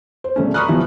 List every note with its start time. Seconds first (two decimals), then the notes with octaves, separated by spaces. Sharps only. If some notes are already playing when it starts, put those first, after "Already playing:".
0.24 C5
0.36 E1 A3 C#4
0.54 A#5 B5 C#6 D#6 F6 F#6
0.68 G2 B2 E3 F3